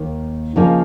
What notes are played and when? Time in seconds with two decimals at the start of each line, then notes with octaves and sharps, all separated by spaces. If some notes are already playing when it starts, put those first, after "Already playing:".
Already playing: D#2 D#3 A#3
0.56 C#3 F3 A#3 D#4